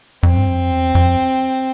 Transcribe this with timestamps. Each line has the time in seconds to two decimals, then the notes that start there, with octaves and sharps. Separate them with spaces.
0.23 F2 C4
0.37 G2
0.47 F2
0.71 E2
0.95 F2